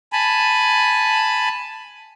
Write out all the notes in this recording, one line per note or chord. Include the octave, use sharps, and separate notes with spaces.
G#5 A5 B5